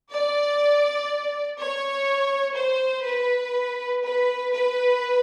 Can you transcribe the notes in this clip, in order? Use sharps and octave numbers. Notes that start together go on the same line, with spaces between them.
D5
C#5
C5
B4
B4
B4